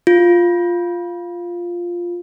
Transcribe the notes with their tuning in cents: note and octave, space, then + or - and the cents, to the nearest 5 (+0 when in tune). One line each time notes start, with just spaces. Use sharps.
F4 +0